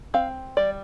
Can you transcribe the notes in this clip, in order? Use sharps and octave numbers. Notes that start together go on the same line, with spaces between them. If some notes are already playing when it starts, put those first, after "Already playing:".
C4 F5
G3 D5